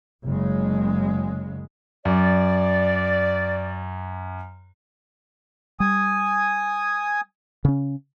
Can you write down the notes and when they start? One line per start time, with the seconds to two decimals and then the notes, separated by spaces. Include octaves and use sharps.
0.25 F#1 C#3 G#3
2.05 F#2 D5
5.80 G3 G#5 D#6
7.65 C#3 C#4